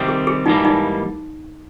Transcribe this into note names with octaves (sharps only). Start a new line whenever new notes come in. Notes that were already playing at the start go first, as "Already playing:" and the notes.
Already playing: C3 D#3 G3 C4
G#4
G#4
G#2 E3 G3 A#3 D#4
D#4